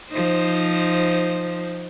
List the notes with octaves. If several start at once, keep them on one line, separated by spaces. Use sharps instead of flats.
F3 D#4 C5